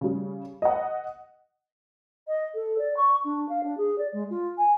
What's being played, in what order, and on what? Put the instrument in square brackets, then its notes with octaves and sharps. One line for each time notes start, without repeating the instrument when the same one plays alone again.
[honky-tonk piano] C#3 G3
D#5 F#5
[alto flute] D#5
A4
D5
C#6
D4
F5
D4
G#4
D5
G#3
F4
G#5